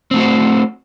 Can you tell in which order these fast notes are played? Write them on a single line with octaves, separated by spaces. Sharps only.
C4 A3 F#4 C5